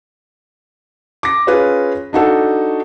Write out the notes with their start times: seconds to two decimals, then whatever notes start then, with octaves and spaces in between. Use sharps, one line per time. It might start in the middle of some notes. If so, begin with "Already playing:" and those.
1.23 D6 A#6
1.47 C#4 F4 G#4 B4
2.13 D4 D#4 F#4 A4